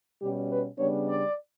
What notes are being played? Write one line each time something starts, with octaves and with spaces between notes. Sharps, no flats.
B2 G3 C#4 G4
B4
C#3 G3 B3 D4 C#5
D5